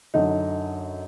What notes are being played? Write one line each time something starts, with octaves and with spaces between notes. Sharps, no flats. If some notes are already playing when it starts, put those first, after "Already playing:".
F#2 D3 D#4